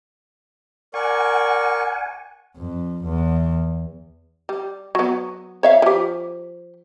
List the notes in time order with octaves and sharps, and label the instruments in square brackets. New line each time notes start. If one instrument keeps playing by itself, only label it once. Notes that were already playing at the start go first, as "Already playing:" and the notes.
[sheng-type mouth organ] A#4 D5 C#6 [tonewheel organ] F#5 G#5
[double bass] F2
E2
[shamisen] G3
F#3 B3
C#5 E5 F5
F3 G4